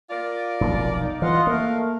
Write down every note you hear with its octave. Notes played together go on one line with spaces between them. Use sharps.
F4 A#4 D5
F1 B1
D#4
E3 F4 D#5 F5 F#5
A3 A#3 A#4